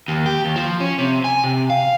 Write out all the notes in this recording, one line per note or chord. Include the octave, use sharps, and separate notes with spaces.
D#2
G4
D#2
F3
C#4
C3
G#5
C3
F5